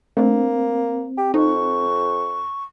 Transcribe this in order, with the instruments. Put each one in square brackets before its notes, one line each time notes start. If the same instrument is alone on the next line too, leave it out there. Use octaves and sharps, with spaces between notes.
[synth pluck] A3 D4 [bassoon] A#3 [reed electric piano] C4
[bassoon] G4
[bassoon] F2 [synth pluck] D#4 [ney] C#6